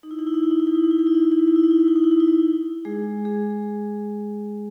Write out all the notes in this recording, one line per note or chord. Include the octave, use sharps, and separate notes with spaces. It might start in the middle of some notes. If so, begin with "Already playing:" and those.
D#4
E4
D#4
E4
D#4
E4
D#4
E4
D#4
E4
D#4
E4
D#4
E4
D#4
E4
D#4
E4
D#4
E4
D#4
E4
D#4
E4
D#4
E4
D#4
E4
D#4
G#3 G#4
G#3 G#4